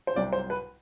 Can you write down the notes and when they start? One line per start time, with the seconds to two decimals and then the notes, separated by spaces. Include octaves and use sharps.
0.07 C5
0.15 C2 C3 F#3 D5
0.33 C5
0.50 B4